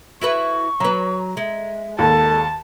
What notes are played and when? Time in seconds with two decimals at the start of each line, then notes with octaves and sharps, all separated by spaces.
0.21 E4 F#4 B4 C#6
0.80 F#3 B4 A#5
1.37 G#3 E5
1.99 D#2 A4 A5